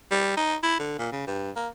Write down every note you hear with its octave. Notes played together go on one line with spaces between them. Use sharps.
G3
D#4
E4
D3
A#2
C#3
G2
A#3